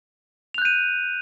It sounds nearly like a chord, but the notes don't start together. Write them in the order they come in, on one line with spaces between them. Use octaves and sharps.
F7 F#6 G6 D#7